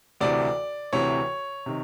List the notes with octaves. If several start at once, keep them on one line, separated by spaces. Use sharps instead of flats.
D2 C3 E3 D5
D2 C3 E3 C#5
C3 D#3